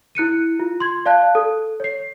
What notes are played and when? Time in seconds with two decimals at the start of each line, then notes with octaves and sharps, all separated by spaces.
0.15 E4 F#6 C#7 D#7
0.60 F4
0.80 C6 G#6
1.06 D5 F5 A5 F#6
1.35 A4
1.80 C#5 C7